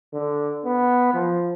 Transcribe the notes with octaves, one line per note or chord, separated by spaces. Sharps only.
D3
B3
F3